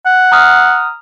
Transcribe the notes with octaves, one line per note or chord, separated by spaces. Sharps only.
F#5
A#5 D#6 F6